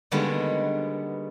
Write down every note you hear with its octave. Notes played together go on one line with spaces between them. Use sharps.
D3 D#3 G3 G#3 A#3 B3